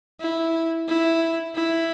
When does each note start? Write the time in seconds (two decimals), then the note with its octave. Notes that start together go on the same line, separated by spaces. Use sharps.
0.21 E4
0.88 E4
1.56 E4